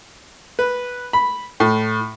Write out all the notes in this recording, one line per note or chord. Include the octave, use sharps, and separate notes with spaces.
B4
B5
A2